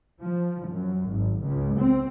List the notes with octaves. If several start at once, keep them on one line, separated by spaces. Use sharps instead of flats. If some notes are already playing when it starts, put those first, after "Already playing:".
F3
F#2
G#1
C#2
C4